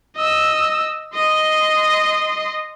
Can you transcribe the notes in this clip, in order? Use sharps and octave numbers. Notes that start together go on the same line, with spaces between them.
D#5 E6
D#5 C6